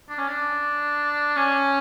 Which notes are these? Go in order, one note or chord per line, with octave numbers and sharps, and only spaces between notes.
D4
C#4
D4
C#4